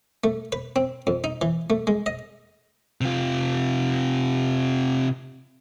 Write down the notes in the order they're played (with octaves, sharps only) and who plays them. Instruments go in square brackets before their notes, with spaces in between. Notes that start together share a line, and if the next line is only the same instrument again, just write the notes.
[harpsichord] A3
B4
C4
F2
D#4
E3
A3
G#3
D#5
[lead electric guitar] C3 F4